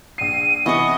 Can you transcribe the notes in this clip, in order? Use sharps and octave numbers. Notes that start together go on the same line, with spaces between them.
A#1 C7 D#7
C3 E3 B3 B4 D#5 C#6